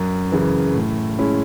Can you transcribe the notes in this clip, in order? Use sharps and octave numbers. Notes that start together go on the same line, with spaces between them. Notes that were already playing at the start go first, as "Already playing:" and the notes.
Already playing: F#2
C#3 E3
A2
G#3 C#4 E4